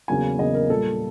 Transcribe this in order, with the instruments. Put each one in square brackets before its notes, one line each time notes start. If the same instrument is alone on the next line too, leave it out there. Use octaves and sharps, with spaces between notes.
[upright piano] E2 C#3 F#3 A#3 G#5
E2 C#3 F#3 A#3 D#5
A#4
A#2 G3 A#3 A4